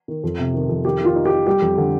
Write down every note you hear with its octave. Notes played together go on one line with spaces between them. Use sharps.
D#3
F2
C3
D#3
F2
D#3 G4
D#3 F4
D#4
G4
D#4
G3 G4
F2
D3